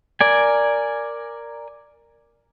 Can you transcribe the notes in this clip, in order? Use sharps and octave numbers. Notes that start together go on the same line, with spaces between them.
A#4 D5 G#5